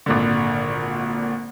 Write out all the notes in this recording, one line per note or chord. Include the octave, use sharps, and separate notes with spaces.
G#1 A#2 D3